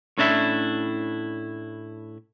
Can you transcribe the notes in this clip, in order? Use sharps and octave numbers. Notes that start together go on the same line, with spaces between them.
A2 C#4 D4 E4 E5